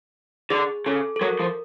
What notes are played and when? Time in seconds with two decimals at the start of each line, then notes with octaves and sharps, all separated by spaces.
0.50 D3 G#4
0.86 C#3 A4
1.16 A4
1.21 F#3 A#4
1.39 F3